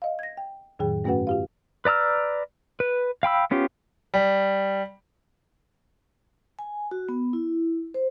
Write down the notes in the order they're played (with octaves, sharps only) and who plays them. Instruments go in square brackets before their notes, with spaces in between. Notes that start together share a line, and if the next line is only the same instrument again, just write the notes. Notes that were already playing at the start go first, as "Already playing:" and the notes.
[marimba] D#5 F5
G#6 A#6
G5
F2 A2 D#3 F#3 G#4 G5
G2 A3 C#4 F#4 B4 F#5
F4 G4 F5
[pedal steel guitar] B4 D5 A#5 E6 F6
B4
F5 G5 B5 E6
B3 C#4 F4 G4
[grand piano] G3
[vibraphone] G#5
F#4
B3
E4
C5